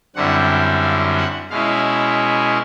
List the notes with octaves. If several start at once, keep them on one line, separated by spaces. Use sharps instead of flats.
F#2 D3 G3 C4 E4 F#5
F5
F#5
B2 G#3 C#4 E4 F5